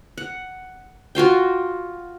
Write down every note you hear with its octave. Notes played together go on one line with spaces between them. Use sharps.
F#5
F4 F#4 F5 G5